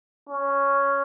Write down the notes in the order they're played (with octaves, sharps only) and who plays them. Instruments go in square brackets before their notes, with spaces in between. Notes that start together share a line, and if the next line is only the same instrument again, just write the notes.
[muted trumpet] C#4